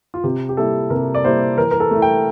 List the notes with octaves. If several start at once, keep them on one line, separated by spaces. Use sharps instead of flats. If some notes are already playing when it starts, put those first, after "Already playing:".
F4
C3 G4
G4
G3 A#3 E4 A4
C3 A#4
D5
G3 A#3 E4 C5
E3 A#4
A#4
A4
A3 E4
G5